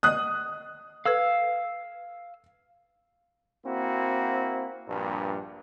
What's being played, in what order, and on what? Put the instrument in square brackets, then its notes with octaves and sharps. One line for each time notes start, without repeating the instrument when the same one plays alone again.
[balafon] A#3 D#5 [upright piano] D#6 F#6
[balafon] A4 B4 [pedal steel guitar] F5 E6
[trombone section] A#3 C4 E4 F#4
A#1 G2